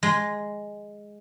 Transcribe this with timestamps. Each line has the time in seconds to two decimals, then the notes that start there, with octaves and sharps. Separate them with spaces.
0.03 G#3